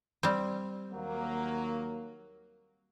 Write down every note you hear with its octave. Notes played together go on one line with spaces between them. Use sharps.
G3 C4
D#2 F#3 A#3